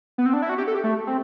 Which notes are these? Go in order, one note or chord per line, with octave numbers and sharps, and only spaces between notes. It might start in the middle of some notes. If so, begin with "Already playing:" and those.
B3
C4
D4
E4
F#4
G4
A4
G4
A3
C4